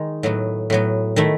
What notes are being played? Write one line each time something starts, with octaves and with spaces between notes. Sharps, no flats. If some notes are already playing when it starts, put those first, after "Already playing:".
Already playing: D#3 G#3 D#4
A2 F#3 B3
A2 F#3 B3
D#3 A3 E4